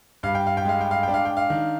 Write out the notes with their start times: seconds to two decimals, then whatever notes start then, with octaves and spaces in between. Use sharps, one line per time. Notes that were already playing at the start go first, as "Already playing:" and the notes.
0.23 G2 F5
0.35 G5
0.47 F5
0.57 G5
0.65 G#3 F5
0.81 G5
0.91 F5
1.03 D4 G5
1.14 F5
1.25 G5
1.37 F5
1.50 D#3